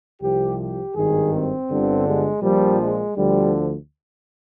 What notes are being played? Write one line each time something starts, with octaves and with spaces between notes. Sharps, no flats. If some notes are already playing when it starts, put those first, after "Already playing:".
C2 C3 F3 G4
G4
G#1 G2 D#3 G#4
C4
G1 G2 D3
G#3
A#1 A#2 F3 G3
G#3
D2 D3 F3 G3